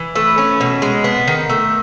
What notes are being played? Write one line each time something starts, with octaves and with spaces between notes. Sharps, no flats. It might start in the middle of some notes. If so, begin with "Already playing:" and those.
Already playing: E3
A3 B4
C#4
B2
G#3
B3
D#3
A3